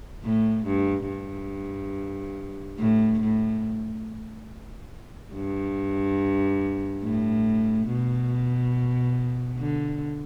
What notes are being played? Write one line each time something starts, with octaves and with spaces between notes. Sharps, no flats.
A2
G2
G2
A2
A2
G2
A2
B2
D3